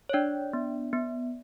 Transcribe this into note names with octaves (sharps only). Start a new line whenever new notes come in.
C#5
D4 D5
B3
B3